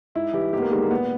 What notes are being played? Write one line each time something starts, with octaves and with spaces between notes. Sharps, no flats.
G#2 E4
E3 G3 G4
G#2 G4
B3
A#3
D#3 G3 G#3
A#3
A#2 B3